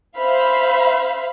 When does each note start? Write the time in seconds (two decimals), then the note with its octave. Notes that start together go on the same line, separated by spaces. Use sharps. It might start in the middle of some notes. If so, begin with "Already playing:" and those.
0.19 C5 E5 F5 B5